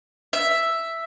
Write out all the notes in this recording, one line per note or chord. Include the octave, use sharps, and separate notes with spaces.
E5